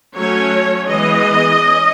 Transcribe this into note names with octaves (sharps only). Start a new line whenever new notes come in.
F#3 A3 C#4 C#5
E3 G#3 B3 D#5
C#4